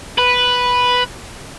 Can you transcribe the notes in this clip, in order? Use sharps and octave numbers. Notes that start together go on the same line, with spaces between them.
B4